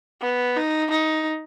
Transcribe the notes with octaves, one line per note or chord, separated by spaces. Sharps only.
B3
D#4
D#4